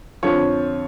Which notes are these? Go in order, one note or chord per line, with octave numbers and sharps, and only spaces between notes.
F2 D3 F3 C#5